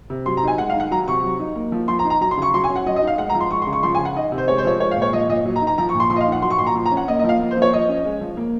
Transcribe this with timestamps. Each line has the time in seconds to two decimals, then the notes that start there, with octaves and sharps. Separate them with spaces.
0.10 C3
0.26 F#3 C6
0.37 A#5
0.43 D#4 G#5
0.58 G#3 F#5
0.70 F5
0.74 D#3
0.80 F#5
0.91 F#3 A#5
1.08 C3 C#6
1.23 F#3
1.39 D#4
1.55 A#3
1.72 F3
1.88 F3 C6
1.99 A#5
2.05 D#4
2.10 A#5
2.21 F#3 A#5
2.31 C6
2.38 C#3 C#6
2.54 F#3 C6
2.64 G#5
2.69 C#4
2.76 F#5
2.86 F#3 D#5
2.96 D#5
3.02 D#4
3.07 F5
3.18 G#3 F#5
3.29 A#5
3.35 F3
3.41 C6
3.51 G#3 C#6
3.62 C6
3.67 C#3
3.73 C#6
3.83 F3 C6
3.95 G#5
3.99 C#3
4.05 F#5
4.16 D#3 D#5
4.32 C3
4.38 C5
4.48 G#3 C#5
4.58 C5
4.65 F3 C#5
4.80 G#3 C#5
4.91 F5
4.96 A#2
5.02 C#5
5.13 F3 D#5
5.29 A#2 D#5
5.45 F#3
5.56 A#5
5.62 D#4
5.67 A#5
5.78 F3 A#5
5.89 C#6
5.94 A#2
6.00 C6
6.10 F3 C6
6.16 D#5
6.21 F5
6.27 D#4
6.32 F#5
6.42 F#3 C6
6.50 C#6
6.58 A#2 C6
6.67 A#5
6.76 F3
6.86 A#5
6.92 C#4
6.97 F#5
7.08 A#3 D#5
7.19 D#5
7.24 F3 F5
7.41 A#3
7.51 C5
7.57 F3 C#5
7.73 F3 D#5
7.89 C#4
8.05 G#3
8.21 F3
8.37 A#3